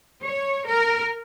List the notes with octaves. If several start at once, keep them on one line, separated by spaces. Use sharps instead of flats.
C#5
A#4